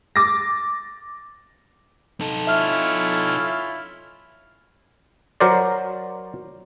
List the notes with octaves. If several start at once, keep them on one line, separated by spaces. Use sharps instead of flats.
D6 A6 A#6
D#4 A4
C#4 E4 F4 E5 F6
F#3 A#4 C5 D5